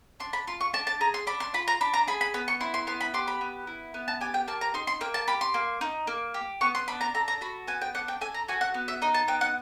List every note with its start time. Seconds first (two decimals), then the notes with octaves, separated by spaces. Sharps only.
0.20 D4 C6
0.33 B5
0.47 F4 C6
0.61 C#6
0.73 D4 A5
0.87 A5
1.01 G#4 A#5
1.14 C6
1.27 D4 B5
1.40 C6
1.54 F4 B5
1.68 A#5
1.81 D4 B5
1.94 A#5
2.08 G#4 B5
2.21 B5
2.34 B3 B5
2.48 C#6
2.61 E4 C6
2.74 C6
2.87 B3 C6
3.01 B5
3.14 G4 C6
3.27 B5
3.41 B3
3.67 E4
3.94 B3
4.08 A5
4.21 G4 G#5
4.34 G5
4.48 A#3 A5
4.61 A#5
4.74 D#4 C6
4.87 C6
5.01 A#3 G5
5.14 A5
5.28 G4 B5
5.41 C6
5.54 A#3
5.81 D#4
6.07 A#3
6.34 G4
6.61 B3 C#6
6.75 C6
6.88 D4 B5
7.01 A#5
7.14 A4 A#5
7.28 A#5
7.41 F#4 B5
7.68 B3 G#5
7.82 G5
7.94 D4 F#5
8.08 G5
8.21 A4 G#5
8.34 A#5
8.48 F#4 G#5
8.61 F#5
8.74 B3
8.88 E5
9.02 D#4 D#5
9.14 A5
9.28 B3 G5
9.41 F#5